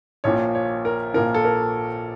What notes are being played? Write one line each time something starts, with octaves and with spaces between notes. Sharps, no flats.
A#1 A#2 F3 C#5
C#5
A#4
A#1 A#2 F3 A#4
A4
A#4